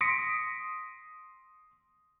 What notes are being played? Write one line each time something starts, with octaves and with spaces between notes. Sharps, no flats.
C6 D#6 A#6 B6 C#7 D7